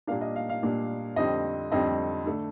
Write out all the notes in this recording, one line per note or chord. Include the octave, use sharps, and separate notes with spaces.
A#2 G3 A#3 D4 F5
D#5
F5
F5
A#2 G3 A#3 D4
F2 D3 G3 C4 D#5
F2 D3 G3 C4 D#5
D3 A3 D4